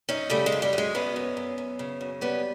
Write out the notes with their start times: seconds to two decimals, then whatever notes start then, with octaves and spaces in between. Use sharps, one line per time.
0.09 F#2 C#4 D#4
0.30 C#3 G3 A3
0.46 G#3
0.52 F#2
0.62 G3
0.73 F#2
0.78 G#3
0.95 F#2 B3 C#4
1.16 F#2
1.37 F#2
1.58 F#2
1.79 C#3
2.01 F#2
2.21 G3 B3 C#4